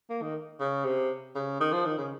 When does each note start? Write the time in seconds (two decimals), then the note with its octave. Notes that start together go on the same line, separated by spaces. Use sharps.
0.10 A#3
0.22 D#3
0.60 C#3
0.85 C3
1.35 C#3
1.60 D#3
1.72 F3
1.86 D#3
1.98 C#3